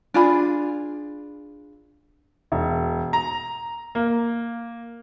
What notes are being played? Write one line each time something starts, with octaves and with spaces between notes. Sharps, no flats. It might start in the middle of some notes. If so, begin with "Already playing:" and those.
D4 F4 G#4 B5
E1
A#5
A#3